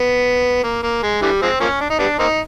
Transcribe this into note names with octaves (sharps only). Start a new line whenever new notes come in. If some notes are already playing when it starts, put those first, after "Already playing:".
Already playing: B3
A#3
A#3
G#3
D3 E3 G3
F3 G#3 C4
F3 A#3 C#4
D4
D#4
G3 B3 D4
A#3 C4 D#4